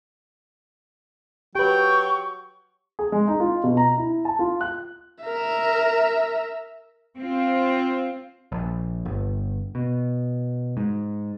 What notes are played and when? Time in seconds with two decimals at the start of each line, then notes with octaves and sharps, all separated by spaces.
1.55 F#3 G4 B4 G5 C#6
2.99 G#4
3.12 G#3
3.28 D#4
3.40 F4
3.64 B2
3.77 A#5
3.97 E4
4.25 A5
4.39 F4
4.61 F#6
5.24 A#4 E5
7.17 C4 F4
8.52 A#1
9.05 G1
9.75 B2
10.77 G#2